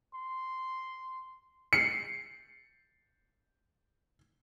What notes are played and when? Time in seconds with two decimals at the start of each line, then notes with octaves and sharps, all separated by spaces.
0.14 C6
1.73 C7 C#7